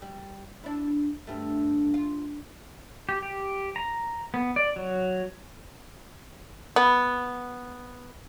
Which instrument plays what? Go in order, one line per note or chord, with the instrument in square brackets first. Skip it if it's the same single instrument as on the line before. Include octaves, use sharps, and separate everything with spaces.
[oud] G3
D4 E4
D2 G2 A3
F4
[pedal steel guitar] G4
G4
A#5
B3
D5
F#3
[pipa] B3